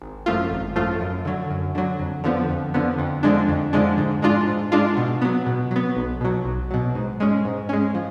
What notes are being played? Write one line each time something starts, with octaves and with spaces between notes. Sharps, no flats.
G#1
F#2 F3 A3 F4
G#1
F#2 F3 A3 F4
F#2
D3 F#3
F#2
D3 F#3
F2
D3 F3 B3
F2
D3 F3 B3
F2
D3 F3 G#3 D4
F2
D3 F3 G#3 D4
G#2
G#3 D4 F4
G#2
G#3 D4 F4
B2
F#3 B3
B2
F#3 B3
B1
B2 F#3
B1
B2 F#3
G#2
G#3 C#4
G#2
G#3 C#4
F3